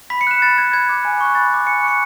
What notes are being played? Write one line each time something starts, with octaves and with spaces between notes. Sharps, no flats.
B5 B6
C#7
F#6 E7
B5 A6
F#6 G#6
B5 G#6
D6 F#6
G#5
C#6 F#6
B5 A6
D6 F#6
G#5 C#7
C#6 F#6 C#7